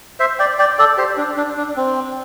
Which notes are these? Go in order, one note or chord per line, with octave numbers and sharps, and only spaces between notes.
C5 E5
D5 G5
D5 G5
A4 D5
G4 C5
D4
D4
D4
C4